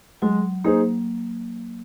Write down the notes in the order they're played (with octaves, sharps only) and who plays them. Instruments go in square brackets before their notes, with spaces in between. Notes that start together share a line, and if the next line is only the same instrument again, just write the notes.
[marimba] F#3 [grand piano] G#3
[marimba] A#3 [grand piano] D#4 G#4 C5